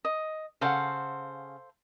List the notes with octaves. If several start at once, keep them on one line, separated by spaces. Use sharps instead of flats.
D#5
C#3 A4 C5 F5 F#5